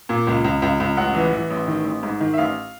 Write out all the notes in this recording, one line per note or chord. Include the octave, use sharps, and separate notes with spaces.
A#2
C#2
C#2
C#2
C#2
A1 F#5
E3
E3
A1
D#3
A1
G#2
D#3
E5
A1 F5